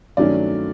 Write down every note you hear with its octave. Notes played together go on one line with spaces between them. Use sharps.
G2 D#3 F#3 A3 C#4 D5